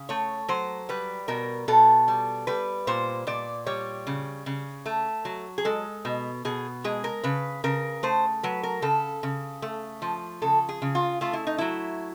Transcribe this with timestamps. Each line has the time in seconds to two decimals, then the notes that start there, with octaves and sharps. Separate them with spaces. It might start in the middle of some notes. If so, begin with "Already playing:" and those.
Already playing: C#3
0.09 A3 C#5
0.49 F#3 C5
0.89 G3 B4
1.28 B2 A#4
1.68 B2 A4
2.08 G3
2.47 G3 B4
2.87 A#2 C5
3.27 A#2 D5
3.66 G3 C#5
4.07 C#3
4.46 C#3
4.86 A3
5.25 F#3
5.58 G#4
5.65 G#3 A4
6.05 B2
6.45 B2 G#4
6.84 G#3 G#4
7.04 A#4
7.24 C#3 B4
7.64 C#3 A#4
8.03 A3 C5
8.43 F#3 B4
8.63 A#4
8.82 C#3 A4
9.23 C#3
9.62 A3
10.02 F3
10.42 C#3 A4
10.69 G#4
10.82 C#3
10.95 F4
11.21 A3 F4
11.33 E4
11.47 D#4
11.58 F#3 E4